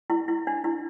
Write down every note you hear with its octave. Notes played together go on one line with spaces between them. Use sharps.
E4
E4
D4
E4